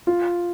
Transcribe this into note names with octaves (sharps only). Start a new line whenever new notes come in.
F4